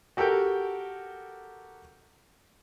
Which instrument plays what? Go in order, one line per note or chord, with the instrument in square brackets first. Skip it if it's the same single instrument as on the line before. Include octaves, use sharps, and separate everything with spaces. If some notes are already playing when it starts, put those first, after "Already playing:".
[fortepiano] F#4 G4 A4 A#4 G5